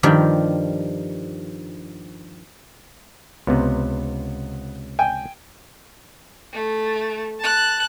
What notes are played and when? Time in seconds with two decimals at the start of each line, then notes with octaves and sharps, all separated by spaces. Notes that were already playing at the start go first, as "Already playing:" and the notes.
0.03 G2 D#3 F3 G4
3.47 C#2 C3 B3
4.99 G5 G#5
6.53 A3
7.40 A5 F#6